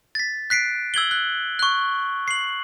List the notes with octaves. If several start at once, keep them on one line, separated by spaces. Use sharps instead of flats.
A6 B6
F#6 B6 C7 D7
E6 G#6 F#7 G7
F#6
C#6 F#6
C7 F#7